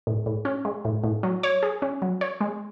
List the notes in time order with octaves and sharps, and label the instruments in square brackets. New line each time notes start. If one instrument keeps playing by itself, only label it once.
[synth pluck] A2
A2
C#4
G#3
A2
A2
F#3
C#5
G#4
C#4
F#3
C#5
G#3